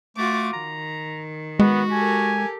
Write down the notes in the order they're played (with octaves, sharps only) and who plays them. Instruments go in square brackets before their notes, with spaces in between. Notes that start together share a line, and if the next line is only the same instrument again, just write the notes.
[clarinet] A3 [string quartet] F4 F#4 D6
[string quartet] D#3 [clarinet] A#5
[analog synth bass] G#3 [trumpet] B3 [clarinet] F#4
[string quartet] G4 A4 A#4 [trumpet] G#5